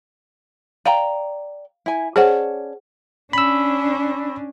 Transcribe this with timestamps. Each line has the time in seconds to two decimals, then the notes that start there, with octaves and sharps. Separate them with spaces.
0.86 D5 F5 G5 A#5
1.86 E4 G#5
2.16 C#4 G#4 C5 D5 F#5 A5
3.33 C#4 D4 B5 E6